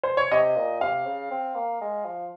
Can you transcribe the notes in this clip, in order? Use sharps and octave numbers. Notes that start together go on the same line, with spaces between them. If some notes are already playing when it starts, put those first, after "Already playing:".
C5
C#5
C3 D#5
A#2
C3 F5
C#3
C4
A#3
G#3
F3